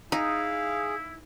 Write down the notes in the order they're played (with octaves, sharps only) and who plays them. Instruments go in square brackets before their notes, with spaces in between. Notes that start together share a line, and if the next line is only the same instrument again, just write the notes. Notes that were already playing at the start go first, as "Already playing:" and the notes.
[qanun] D#4 [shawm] E4 [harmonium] G#4 [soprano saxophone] F5